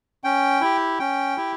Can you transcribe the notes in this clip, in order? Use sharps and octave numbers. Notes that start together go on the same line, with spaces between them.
C#4 G5
E4 G4
C#4 G5
E4 G4